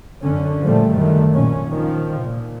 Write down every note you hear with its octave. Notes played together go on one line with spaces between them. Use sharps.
F#2 D3 C#4
A#2 F3 G3 A3
F#2 D#3 A3
A#1 A#2 C#4
D#3 F3
A#2